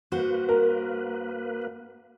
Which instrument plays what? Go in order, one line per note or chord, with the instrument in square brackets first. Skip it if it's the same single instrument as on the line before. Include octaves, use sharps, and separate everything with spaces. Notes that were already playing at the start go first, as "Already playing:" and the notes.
[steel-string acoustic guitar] G2 F#4 C5 [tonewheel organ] A#3 B4
[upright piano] A#4